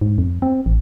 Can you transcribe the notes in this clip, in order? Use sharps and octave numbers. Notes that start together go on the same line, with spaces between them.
G#2
F2
C4
A1